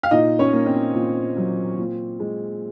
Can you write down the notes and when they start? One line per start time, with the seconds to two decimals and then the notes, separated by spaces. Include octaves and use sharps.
0.03 F5
0.11 A#2 D#4 D#5
0.39 C#4 C#5
0.53 A#3
0.66 C4 C5
0.95 A#2
1.37 F#3
1.78 A#2
2.20 G#3